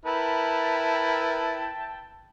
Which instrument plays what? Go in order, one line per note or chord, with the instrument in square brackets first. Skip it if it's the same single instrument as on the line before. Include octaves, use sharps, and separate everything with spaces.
[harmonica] E4 A#4 [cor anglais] B4 [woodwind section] E5 G5 A5